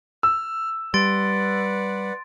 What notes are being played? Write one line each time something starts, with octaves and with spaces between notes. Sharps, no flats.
E6 F6
G3 B4 D5 F#5 C6 A6 D7